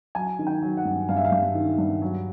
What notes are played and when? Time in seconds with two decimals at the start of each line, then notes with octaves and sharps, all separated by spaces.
0.15 F#3 G#5
0.39 D#3
0.47 G5
0.62 F#3
0.77 F#5
0.85 G2
1.09 G2 F5
1.17 E5
1.25 F5
1.32 G2
1.55 D#3
1.78 G2
2.02 F#3